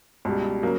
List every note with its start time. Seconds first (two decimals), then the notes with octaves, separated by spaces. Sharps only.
0.25 C#2 B2 G3
0.63 C#3 F#3 A#3